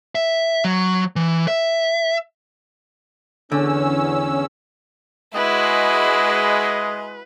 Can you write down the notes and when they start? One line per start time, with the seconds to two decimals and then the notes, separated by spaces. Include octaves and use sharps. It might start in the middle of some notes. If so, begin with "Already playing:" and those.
0.15 E5
0.65 F#3
1.16 E3
1.48 E5
3.52 E2 D3 C#4 E6
5.35 G#3 E4 F#4 B4 D#5